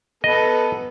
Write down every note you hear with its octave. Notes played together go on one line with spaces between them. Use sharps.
B3 A4 B4 D#5